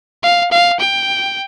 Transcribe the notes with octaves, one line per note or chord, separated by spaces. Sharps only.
F5
F5
G5